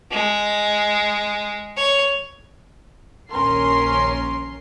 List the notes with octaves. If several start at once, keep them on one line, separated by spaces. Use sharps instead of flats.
G#3
C#5
A#1 D#2 C#4 A#4 C6 C7